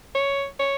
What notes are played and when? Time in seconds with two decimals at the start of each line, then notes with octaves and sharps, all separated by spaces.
0.15 C#5
0.60 C#5